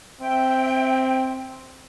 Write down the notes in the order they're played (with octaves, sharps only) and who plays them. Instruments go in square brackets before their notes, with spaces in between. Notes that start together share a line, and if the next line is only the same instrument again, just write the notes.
[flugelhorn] C4 [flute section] E5 G5